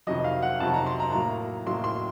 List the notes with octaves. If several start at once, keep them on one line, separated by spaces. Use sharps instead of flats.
F2 C3 D#3 F#3 D#5
F5
F#5
F2 C3 D#3 F#3 A5
A#5
C6
A#5
A2 F#3 A#3 A#5
A2 F#3 A#3 C6
C6